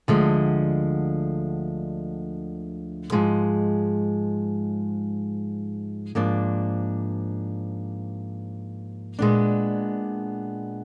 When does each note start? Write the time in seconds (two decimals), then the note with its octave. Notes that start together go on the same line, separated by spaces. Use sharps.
0.08 D2 D3 F3 G#3
3.12 G#2 F3 G#3
6.15 G#2 F3 A#3 D4
9.19 A#2 G#3 B3 D4